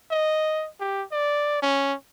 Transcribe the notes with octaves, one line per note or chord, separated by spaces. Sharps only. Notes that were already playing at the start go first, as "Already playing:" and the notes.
D#5
G4
D5
C#4